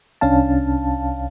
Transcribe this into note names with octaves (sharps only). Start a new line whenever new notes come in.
C2 C#4 D4 F5 A5